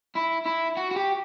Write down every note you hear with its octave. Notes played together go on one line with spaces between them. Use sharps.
E4
E4
F#4
F#4
G4